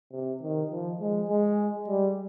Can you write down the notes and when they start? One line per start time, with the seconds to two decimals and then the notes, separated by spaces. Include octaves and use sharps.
0.12 C3
0.42 D#3
0.71 F3
1.00 G#3
1.29 G#3
1.88 G3